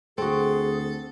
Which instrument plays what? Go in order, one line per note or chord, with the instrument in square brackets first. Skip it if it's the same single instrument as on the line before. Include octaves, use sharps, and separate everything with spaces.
[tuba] D2 [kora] C4 F#4 [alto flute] G#4 [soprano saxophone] A4